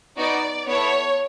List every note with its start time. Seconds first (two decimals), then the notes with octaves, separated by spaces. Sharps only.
0.16 B3 D#4 F#4 D5
0.67 B3 E4 A4 C#5